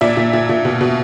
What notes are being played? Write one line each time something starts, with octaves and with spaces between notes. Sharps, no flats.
A#2 D5 E5
A#2
A#2
A#2
B2
B2